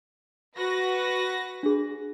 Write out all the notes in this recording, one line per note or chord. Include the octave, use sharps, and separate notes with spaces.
F#4 B4 A#6
D4 G#4